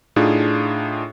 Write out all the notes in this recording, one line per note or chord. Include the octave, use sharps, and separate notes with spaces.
A2 D4 D#4 F4 G#4